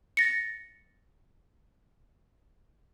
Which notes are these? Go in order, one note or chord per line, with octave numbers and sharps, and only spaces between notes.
A6 A#6 C#7